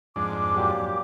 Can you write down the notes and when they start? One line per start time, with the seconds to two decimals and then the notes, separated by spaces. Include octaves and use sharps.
0.16 F2 G#2 D4 D6
0.56 A#2 F#3 G4